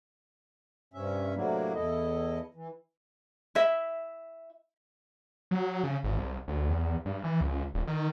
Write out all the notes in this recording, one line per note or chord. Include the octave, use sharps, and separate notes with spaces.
G2 C3 C#4 E5
A2 C3 F#3 A#3 D4 E4
E2 E4 A4 D#5
E3
E4 E5
F#3
C#3
G#1
C2
D2
E2
G2
E3
C#2
D#1
D#3